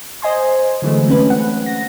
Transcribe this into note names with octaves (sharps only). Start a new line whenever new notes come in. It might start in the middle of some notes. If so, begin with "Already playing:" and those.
C5 D#5 G#5 C6
D3 E3 F#3 G#3 A3
C4 C#4 B4
F#5
A#6